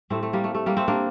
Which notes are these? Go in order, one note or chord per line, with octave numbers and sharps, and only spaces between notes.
A2 G3 A3 C4
A3
G3 A#3
A3
A3
G3 A#3
A3 C4
A#3 D4